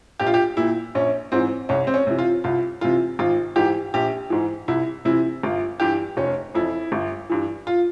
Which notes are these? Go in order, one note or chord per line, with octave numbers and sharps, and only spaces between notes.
A#1 G4
F4
G4
A#2 E4
A#1 C#4
G#2 E3 C4
C2 C#4
C4
C#4
C3 E3
F4
C2 F4
C3 E3 F4
G#1 F4
G#2 E3 G4
A#1 G4
G#2 E3
C2 E4
C3 E3 E4
G1 F4
G2 E3 G4
F1 C#4
F2 E3 E4
G1
G2 E3
F4